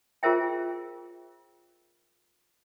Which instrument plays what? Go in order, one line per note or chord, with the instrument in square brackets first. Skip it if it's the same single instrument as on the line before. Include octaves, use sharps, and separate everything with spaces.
[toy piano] F4 G#4 A#4 C5 E5 G5